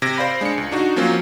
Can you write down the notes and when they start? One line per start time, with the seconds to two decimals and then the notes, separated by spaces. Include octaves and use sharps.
0.02 C3 G#6 A#6 D7
0.18 C5 D5 F5 B5
0.41 G#3 D4 C7 C#7
0.58 C#2
0.72 D4 D#4 F#4
0.96 F3 F#3 A#3 C4 C#4 F4